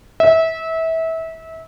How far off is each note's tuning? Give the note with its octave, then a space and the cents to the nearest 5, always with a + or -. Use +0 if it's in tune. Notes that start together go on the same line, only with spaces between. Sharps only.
E5 -25